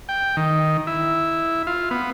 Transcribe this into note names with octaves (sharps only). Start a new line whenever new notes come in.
G5
D#3
E4
F4
B3